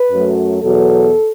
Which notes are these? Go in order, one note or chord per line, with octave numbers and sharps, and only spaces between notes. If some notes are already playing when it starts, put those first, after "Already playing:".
Already playing: B4
F#2 F#3 A3
E2 B2 F#3 B3 A4